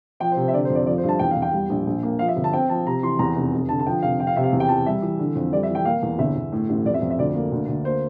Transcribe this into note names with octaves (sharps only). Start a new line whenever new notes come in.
F3 G5
C5
C3
C5
E5
D3 D5
C5
F2
D5
F3 D5
C5
G2
A5
E2 G5
F5
E2
G5
G3
A#1
A#1
A#3
F3 F5
E5
G1
A5
C4 G5
F3 A5
C3 A#5
E3 C6
E2 A#5
F1
F1
D3 A5
A5
F3 G5
F1 F5
F3 G5
F5
C3 E5
F5
E2
G5
E3 A5
G3 E5
E3
D3
F2
G3 D5
E5
E3
G5
A#3 F5
E2
G1 E5
G1
A2
A1
F2 D5
E5
F2
E5
D2 D5
A#3
D2
D2
A#3 C5